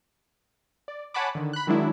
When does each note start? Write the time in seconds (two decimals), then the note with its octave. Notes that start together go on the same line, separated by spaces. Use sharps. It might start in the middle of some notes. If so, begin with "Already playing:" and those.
0.88 D5
1.14 C#5 F#5 G#5 A5 B5 D6
1.35 D3 D#3
1.53 B5 F#6
1.67 D#3 F#3 G#3 D4 E4